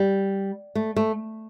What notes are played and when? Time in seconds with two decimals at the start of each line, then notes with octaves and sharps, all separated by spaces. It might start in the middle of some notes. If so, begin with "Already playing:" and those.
Already playing: G3
0.75 A3
0.96 A3